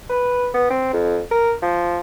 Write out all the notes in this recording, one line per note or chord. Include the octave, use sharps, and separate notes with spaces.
B4
B3
C4
F2
A#4
F3